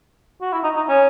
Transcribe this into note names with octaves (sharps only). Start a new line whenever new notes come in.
F#4
E4
D#4
D#4
C#4